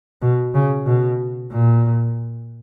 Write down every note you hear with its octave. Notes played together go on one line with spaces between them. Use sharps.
B2
C#3
B2
A#2